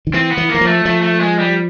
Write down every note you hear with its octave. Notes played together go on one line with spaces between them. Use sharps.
D#3
E3 C4
B3
E3
A#3
E3
F3
A3
F3 A3
A3
G#3
G3